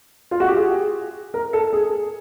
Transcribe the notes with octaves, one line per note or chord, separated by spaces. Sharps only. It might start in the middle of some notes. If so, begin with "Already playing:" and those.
F4
F#4
G4
G#4
A#4
A4
G#4